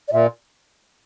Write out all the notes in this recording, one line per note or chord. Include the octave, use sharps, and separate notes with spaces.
D5
A#2 E5